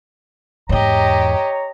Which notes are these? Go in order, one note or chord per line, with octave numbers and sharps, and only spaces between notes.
E2 G#2 G4 C#5 D#5 A#5